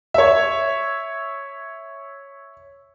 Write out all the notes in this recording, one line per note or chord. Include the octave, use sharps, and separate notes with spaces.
C#5 E5